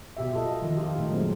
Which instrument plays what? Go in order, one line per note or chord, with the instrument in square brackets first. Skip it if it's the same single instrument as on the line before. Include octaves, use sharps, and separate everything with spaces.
[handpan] B2 G4 E5
F4 A4 D#5
D#3 F3
F3 F4 G4
A#2 A3 D#4
F#3 G#3 C4